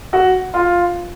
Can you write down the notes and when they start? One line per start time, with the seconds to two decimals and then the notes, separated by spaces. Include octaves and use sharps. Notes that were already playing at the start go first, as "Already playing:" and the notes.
0.13 F#4
0.54 F4